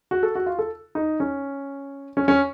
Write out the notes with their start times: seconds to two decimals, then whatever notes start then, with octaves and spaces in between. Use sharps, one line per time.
0.11 F#4
0.23 A4
0.35 F#4
0.46 F4
0.59 A4
0.95 D#4
1.20 C#4
2.17 C#4
2.28 C#4